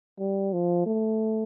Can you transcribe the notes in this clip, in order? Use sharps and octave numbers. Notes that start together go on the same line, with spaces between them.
G3
F3
A3